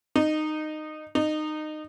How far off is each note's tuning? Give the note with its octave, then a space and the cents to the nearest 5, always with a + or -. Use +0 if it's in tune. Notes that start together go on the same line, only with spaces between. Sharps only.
D#4 -15
D#4 -20